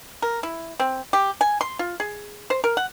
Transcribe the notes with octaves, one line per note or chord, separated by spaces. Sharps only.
A#4
E4
C4
G4
G#5
C6
F4
G#4
C5
A#4
F#5